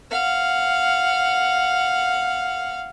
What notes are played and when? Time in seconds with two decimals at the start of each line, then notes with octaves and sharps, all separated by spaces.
0.11 F5 F#5